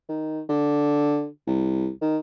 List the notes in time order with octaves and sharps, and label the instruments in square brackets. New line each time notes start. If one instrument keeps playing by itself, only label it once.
[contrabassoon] D#3
D3
C2
D#3